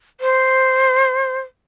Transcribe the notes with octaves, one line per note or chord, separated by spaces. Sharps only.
C5